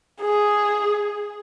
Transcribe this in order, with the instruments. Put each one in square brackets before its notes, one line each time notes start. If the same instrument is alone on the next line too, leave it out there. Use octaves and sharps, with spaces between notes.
[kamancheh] G#4